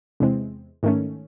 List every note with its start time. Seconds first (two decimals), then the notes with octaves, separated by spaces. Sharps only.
0.20 E2 C3 E3 G#3 C4
0.83 G#2 D#3 A3 C#4